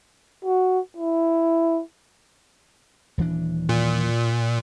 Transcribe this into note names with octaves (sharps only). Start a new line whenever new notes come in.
F#4
E4
D#1 E3 D4
A#2